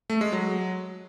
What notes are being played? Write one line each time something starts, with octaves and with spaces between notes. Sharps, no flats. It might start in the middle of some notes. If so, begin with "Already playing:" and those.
A3
G#3
F#3